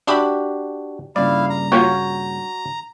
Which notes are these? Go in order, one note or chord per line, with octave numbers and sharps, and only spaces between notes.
D4 F#4 G4 E5 B5 D6
G2 A#2 C#3 E4 D5 F5
A#5
A#3 C#4 F4 F#4 C#5 G5